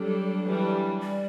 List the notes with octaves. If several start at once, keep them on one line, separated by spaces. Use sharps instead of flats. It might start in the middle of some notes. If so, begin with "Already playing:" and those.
Already playing: F#3 G3 D4 A4
E3 G3 D4
G3